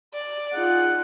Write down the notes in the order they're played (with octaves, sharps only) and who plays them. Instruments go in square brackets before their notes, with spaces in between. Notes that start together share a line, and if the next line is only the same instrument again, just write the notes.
[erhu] D5
[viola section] D#4 F4 G#4 [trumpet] F#5